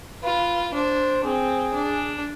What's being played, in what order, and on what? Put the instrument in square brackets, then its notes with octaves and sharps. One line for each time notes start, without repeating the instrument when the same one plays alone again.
[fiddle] F4 [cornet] B4
[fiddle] D4 [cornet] C5
[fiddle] C4 [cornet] G#4
[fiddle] D4